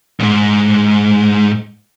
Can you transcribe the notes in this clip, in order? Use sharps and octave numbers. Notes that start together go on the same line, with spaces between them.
C#2 G#2